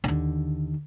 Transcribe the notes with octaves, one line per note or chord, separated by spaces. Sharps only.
D#2 D3